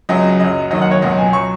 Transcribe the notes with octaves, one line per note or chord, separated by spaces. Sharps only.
C#2 C#3 F#3 D#5
F#2 F#3 D#5
D#2 D#3 F#3 D#5
F#5
C#5
C#2 B2 F#3 D#5
G#5
F#3 C#6